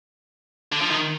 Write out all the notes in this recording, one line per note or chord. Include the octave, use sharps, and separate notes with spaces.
D3
F3
D#3